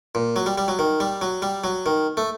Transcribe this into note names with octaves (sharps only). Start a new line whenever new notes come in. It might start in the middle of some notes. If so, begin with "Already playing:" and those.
A#2
F#3
G3
G3
F#3
D#3
G3
F#3
G3
F#3
D#3
A3